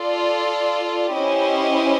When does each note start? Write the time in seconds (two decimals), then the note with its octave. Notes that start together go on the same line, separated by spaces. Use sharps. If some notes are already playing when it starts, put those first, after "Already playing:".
Already playing: F4 A4 D5
1.14 C#4 E4 G4 C5 D#5